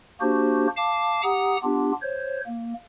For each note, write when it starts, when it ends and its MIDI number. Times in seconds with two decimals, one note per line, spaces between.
0.21 0.67 58
0.21 0.67 62
0.21 0.67 66
0.21 0.67 67
0.21 0.67 72
0.77 1.21 77
0.77 1.21 81
0.77 1.21 86
1.23 1.57 67
1.23 1.57 78
1.23 1.57 82
1.23 1.57 87
1.63 1.92 59
1.63 1.92 62
1.63 1.92 65
1.63 1.92 67
2.02 2.40 72
2.02 2.40 73
2.47 2.74 58